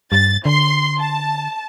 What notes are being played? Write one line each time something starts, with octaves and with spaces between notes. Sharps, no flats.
G2 A6
D3 C6
A5